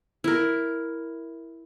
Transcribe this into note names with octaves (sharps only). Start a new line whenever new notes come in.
E4 A#4